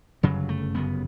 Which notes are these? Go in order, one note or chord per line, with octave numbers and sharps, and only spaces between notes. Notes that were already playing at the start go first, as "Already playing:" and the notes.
G1 F#2 C#3 F#3
A3
G1 F#2 C#3 B3